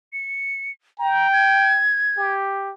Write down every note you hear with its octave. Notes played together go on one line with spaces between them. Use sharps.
C#7
G5 A#5
G#6
G4